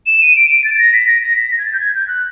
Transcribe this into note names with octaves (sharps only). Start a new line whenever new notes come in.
E7
D#7
D7
D7
A6
A6
A#6
B6
A#6
A#6
B6
A#6
G#6
A6
G6
G#6
G6
F#6